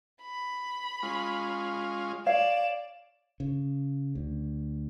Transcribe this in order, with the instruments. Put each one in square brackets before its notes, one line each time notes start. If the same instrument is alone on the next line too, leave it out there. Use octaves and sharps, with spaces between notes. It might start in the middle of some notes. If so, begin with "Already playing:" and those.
[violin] B5
[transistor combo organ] G#3 C#4 F4
[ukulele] C#5 F5 [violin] D5 E7
[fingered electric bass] C#3
D2